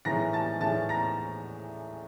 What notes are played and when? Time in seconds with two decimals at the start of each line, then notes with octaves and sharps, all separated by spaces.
0.05 A2 E3 G#3 C#4 A#5 A#6
0.33 A5 A6
0.61 A2 E3 G#3 C#4 A5 A6
0.89 A#5 A#6